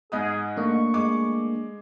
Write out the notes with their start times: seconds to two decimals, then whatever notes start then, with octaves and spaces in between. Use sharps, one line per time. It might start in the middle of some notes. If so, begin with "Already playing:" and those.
0.12 G#2 D#4 G#4 D#6
0.57 A3 A#3 D4 C#6
0.94 G#3 D6